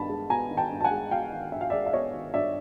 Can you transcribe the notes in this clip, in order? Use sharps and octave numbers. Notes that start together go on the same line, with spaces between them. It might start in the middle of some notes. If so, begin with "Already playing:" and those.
Already playing: G2 D#3 B3 A5 B5
G#3
B3 G#5 A#5
D#3
G5 A5
G2
A5
F#5 G#5
G#3
B3 F5 G5
D#3
G2 E5
F5
D5 E5
G#3
E5
B3 C#5 D#5
D#3
G2 D5 E5